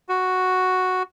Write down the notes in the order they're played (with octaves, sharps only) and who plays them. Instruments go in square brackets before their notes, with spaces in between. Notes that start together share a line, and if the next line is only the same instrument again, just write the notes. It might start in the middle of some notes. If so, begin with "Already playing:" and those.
[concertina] F#4